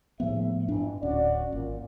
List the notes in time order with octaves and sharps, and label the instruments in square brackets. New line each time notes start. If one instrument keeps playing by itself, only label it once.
[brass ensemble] D#2 C#3 E5 [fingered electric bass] A2 F3 B3
[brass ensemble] F2 E3 [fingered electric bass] G#2 D4
[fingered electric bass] D1 [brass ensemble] C#4 F#4 D5
[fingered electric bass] G#1 [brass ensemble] A#2